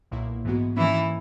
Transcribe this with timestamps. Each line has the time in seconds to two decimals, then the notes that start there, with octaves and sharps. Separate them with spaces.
0.11 B1 A#2 A#3 E4
0.45 G#2 E3 G#3 B3 F#4
0.76 G#2 D#3 E3 A#3 C#4 E4